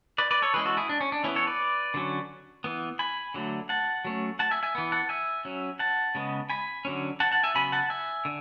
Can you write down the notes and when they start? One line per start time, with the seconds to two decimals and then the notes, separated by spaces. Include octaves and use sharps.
0.18 B4 D5
0.31 B4 D5
0.42 A4 C#5
0.54 E3 G#3 C#4 G#4 B4
0.66 F#4 A4
0.77 E4 G#4
0.89 D4
1.01 C#4
1.12 D4
1.24 E3 B3 C#4 E4
1.35 A4 C#5
1.47 B4 D5
1.94 D3 F#3 C#4
2.64 E3 B3
2.99 G#5 B5
3.34 D3 F#3 A3
3.69 F#5 A5
4.05 F#3 A3 C#4
4.39 F#5 A5
4.51 E5 G#5
4.63 E5 G#5
4.75 E3 B3
4.92 F#5 A5
5.09 E5 G#5
5.45 F#3 C#4
5.79 F#5 A5
6.15 C#3 G#3 B3
6.50 G#5 B5
6.85 D3 F#3 C#4
7.20 F#5 A5
7.32 F#5 A5
7.43 E5 G#5
7.55 C#3 F#3 B3 G#5 B5
7.72 F#5 A5
7.90 E5 G#5
8.25 D3